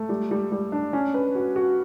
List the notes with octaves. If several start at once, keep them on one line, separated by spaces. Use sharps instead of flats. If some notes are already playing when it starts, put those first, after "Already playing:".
Already playing: A3
G3
G3
G3
D4
C#4
B4
F#4
F#4